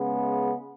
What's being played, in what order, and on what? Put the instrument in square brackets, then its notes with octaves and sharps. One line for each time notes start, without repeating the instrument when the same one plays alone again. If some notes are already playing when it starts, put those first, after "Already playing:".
Already playing: [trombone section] C#3 G#3 B3